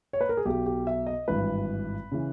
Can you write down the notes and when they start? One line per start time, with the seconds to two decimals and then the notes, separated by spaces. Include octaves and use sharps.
0.13 C#5
0.21 B4
0.29 A#4
0.37 G#4
0.45 B1 B2 G4
0.66 G4
0.87 E5
1.06 D#5
1.28 G#1 G2 E3 B4
2.12 C#3 E3